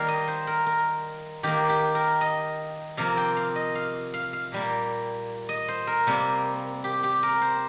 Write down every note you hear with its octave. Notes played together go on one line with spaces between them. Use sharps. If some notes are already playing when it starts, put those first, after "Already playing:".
Already playing: D#3 G3 A#3 F5
D#5
C5
A#4
A#4
D#3 A#3 G4
G4
A#4
D#5
C3 F3 A#3 F5
G5
F5
D#5
F5
F5
F5
A#2 G3 A#3
D#5
C5
A#4
C3 G3 A#3
G4
G4
A#4
C5